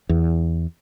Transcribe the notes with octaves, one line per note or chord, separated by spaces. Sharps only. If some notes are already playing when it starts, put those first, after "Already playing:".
E2